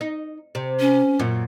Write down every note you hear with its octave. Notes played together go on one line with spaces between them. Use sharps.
D#4
C3
C#4
F#2 A#2